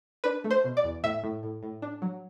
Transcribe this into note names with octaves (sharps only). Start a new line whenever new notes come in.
D4 B4
A3
C5
B2
D5
E2
A2 E5
A2
A2
A2
D4
F#3